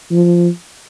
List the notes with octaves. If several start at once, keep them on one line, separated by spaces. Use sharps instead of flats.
F3